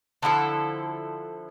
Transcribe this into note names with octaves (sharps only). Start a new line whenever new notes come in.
D3 F3 E4 A4